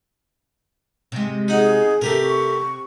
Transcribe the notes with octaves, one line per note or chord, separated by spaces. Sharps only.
C3 G#3
D#4 G#4 F#5
C3 A3 G4 A#4
C#6